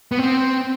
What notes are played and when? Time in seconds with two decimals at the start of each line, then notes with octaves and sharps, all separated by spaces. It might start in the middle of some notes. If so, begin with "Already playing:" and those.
0.12 B3
0.19 C4